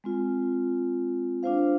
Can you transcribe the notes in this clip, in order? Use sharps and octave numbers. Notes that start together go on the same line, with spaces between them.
G#3 C4 F4
D4 F4 C5 F5